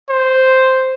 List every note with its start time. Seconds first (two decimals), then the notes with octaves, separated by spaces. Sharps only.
0.09 C5